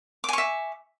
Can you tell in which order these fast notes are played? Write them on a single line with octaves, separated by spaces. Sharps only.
D6 G#5 C#6 E5